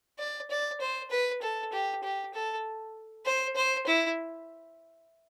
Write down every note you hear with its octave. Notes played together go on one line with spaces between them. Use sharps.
D5
D5
C5
B4
A4
G4
G4
A4
C5
C5
E4